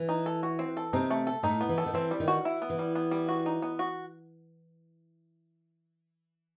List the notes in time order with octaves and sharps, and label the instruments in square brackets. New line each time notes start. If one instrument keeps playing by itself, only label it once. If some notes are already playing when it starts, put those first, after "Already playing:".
Already playing: [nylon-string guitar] E3
[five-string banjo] D#4
A4
F#4
C4
A4
[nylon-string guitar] C3 C4 [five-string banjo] D#4
[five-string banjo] A3
A4
[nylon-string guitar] A2 A3 [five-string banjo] D#4
[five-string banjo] B3
[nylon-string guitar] E3
[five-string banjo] A4
[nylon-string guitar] D#3
[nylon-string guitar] E3 [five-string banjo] C4
[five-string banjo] G3
[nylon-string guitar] D#3
[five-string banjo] F#4
E4
B3
[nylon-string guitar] E3
[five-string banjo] G3
B3
G3
F#4
D#4
B3
F#4